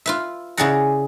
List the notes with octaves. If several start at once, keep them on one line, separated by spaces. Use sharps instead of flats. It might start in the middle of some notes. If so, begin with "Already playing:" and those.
F4 B4 E5
C#3 E4 G#4 D5 F#5 A#5